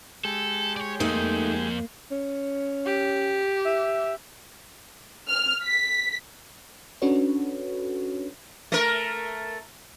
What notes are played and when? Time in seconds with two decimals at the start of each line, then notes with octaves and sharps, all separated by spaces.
0.24 G#3 G4 A4
0.77 C#5 D5
1.00 F2 A3 A#3 D#4
2.11 C#4
2.85 G4
3.65 E5
5.28 F6
5.63 B6
7.02 C#4 D4 F#4 A4 B4 C#5
8.72 A3 A#4